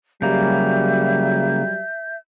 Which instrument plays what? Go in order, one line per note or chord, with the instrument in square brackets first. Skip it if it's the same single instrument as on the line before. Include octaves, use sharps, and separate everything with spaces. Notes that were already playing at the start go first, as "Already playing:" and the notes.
[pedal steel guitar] C#3 A#3 [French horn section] F#3 G3 [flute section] E5 G6